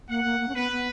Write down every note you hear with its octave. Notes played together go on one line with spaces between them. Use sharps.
A#3 F#5
A#3
A#3
C#4
B3 B4
B3